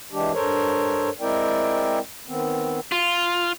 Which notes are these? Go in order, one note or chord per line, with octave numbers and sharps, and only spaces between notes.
E3 G#3 D4 G4
G2 A4 A#4 C5 C#5
G#3 C4 E4 A#4 D5 G5
D#3 B3 C4
F4